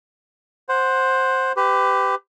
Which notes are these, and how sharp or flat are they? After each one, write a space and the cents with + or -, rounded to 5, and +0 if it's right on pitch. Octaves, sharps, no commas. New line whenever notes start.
C5 +10 F#5 +0
G4 +0 B4 +30